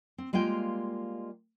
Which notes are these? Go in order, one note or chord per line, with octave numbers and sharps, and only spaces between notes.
C4
G3 G#3 A#3 F4 G5